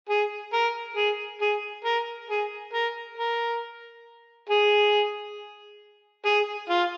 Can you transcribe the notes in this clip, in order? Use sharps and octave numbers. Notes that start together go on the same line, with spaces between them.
G#4
A#4
G#4
G#4
A#4
G#4
A#4
A#4
G#4
G#4
F4